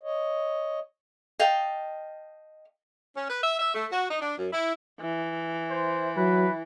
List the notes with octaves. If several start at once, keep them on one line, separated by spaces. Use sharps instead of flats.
C#5 D#5
D#5 F5 G5 A5
C#4
B4
E5
E5
A3
F#4
D#4
D4
F#2
E4
E3
C5
F#3 B4